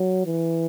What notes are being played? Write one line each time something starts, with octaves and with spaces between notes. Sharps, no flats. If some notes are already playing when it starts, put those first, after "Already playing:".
Already playing: F#3
E3